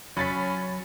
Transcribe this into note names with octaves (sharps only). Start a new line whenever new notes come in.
F#3 C#4 B5 A6 B6